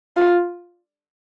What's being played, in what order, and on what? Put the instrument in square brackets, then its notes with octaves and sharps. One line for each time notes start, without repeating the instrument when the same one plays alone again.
[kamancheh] F4